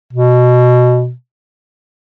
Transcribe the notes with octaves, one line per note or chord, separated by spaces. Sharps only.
B2